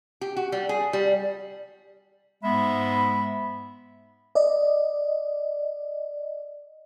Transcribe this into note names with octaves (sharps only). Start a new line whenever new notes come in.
G4
F#4
G3
G#4
G3
G#2 G#3 B3 E5 B5
D5 D#5